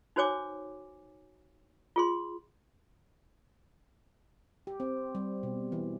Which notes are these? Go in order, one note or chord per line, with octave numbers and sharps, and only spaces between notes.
D#4 F#4 C5 C#5 G#5 D6
F4 G#4 C6
G4
C4
G3
B2
E3